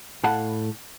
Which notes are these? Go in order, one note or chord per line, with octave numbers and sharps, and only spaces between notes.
A2 A3 F5 F#5 A5 B5